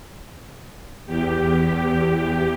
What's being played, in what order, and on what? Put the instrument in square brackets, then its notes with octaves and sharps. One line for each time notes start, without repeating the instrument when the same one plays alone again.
[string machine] E2 G4